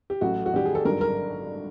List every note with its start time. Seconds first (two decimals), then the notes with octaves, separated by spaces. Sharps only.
0.10 G4
0.21 A1 A2 F#3 F#4
0.46 F#4
0.53 A1 G2 D#3 G3 G4
0.65 G#4
0.75 A4
0.84 G#1 G2 D3 F#3 A#4
1.01 A#4